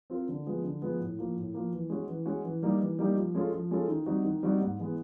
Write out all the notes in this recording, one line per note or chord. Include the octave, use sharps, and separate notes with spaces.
C4 F4 A#4
D3
F3 G#3 B3
D3
F3 G#3 B3
A2
F3 A#3
A2
F3 A#3
E3
G#3 C#4 F#4
E3
G#3 C#4 F#4
E3
G3 A#3 D#4 G4
E3
G3 A#3 D#4 G4
F3
G#3 C#4 F4 A4
F3
G#3 C#4 F4 A4
D#3
G3 C4 D#4 F#4
D#3
G3 C4 D#4 F#4
G#2
E3 G#3 B3